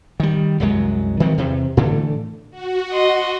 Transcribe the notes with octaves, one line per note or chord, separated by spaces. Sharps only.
D#3 G3
C2 F#2 F#3 G#3
D#3 F3 F#3 C4
E2 C3
A2 D3 E3 A3
F#4
D#5 C6